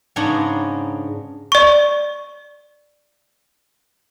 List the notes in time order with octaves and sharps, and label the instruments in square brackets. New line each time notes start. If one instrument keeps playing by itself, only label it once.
[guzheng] G#2 C#3 B3 C#4 D4 A#5
[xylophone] D5 C#6